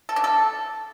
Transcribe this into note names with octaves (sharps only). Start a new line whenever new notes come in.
A4
D4
A4